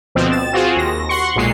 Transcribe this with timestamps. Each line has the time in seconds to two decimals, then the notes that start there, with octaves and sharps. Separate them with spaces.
0.15 D2 B2 F3 C4
0.32 A6 E7
0.53 C4 F4 F#4 G#4
0.76 D#2 A#6
1.09 F#5 C6 C#6
1.36 B1 A#2 G#3 C7